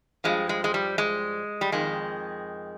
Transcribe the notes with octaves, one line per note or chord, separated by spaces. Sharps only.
G2 F3 G#3
G#3
G#3
G3
G#3
G3
F2 D#3 G#3